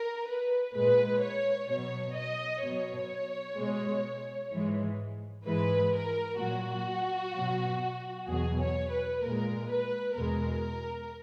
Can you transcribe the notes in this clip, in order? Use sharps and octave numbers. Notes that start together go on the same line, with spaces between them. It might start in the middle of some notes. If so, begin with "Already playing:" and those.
Already playing: A#4
B4
A#2 G#3 B4
C#5
B2 F#3 C#5
D#5
B2 F#3 C#5
B2 G#3
G#2 E3 G#3
G#2 E3 G#3 B4
A#4
A#2 F#3 F#4
B2 F#3
E2 B2 F#3 G#4
C#5
B4
A#2 G#3 A#4
B4
E2 B2 G#3 A#4